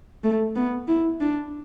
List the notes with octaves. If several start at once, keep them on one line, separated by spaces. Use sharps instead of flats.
A3
B3
E4
D4